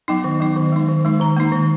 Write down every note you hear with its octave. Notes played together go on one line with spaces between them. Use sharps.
F#3 B3 D#4
D#3
F#3 B3 D#4
D#3
G#3 D#4
D#3
G#3 D#4
D#3 A#5
A#3 D#4
D#3